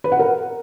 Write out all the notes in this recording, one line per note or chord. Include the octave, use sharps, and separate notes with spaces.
B4
F#5
A#4